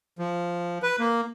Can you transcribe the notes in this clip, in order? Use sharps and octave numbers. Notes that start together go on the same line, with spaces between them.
F3
B4
A#3